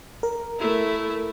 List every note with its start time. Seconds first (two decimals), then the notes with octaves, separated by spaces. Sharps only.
0.23 A#4
0.59 A3 E4